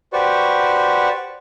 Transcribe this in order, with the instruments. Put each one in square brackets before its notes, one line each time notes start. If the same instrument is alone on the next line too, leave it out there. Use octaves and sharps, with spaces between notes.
[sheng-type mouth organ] F#4 G4 B4 C5 D5 C#6